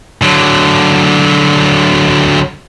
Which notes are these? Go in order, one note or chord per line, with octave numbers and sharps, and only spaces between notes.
D3 F#3